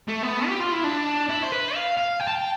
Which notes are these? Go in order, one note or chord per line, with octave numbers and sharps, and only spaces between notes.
A3
B3
G4
F4
E4
D4
E4
C5
B4
F5
F5
G5
A5
G5